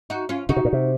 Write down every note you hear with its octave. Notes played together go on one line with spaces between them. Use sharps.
D#4 F#4
C#4 F4
C#3 D#4 F#4
C3
A#2
C3